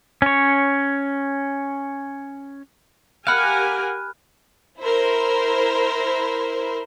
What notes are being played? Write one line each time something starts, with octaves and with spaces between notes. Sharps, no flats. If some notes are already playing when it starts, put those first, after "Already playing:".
C#4 C#5
G4 A#4 F5 F#5 G#5 B5 F6 F#6
E4 A#4 C5